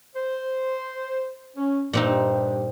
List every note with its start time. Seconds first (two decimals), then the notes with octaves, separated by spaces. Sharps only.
0.16 C5
1.57 C#4
1.93 G2 A#2 C4 D#4